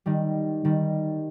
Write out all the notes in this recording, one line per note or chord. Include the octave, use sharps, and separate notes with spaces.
D#3 G3
D#3 G3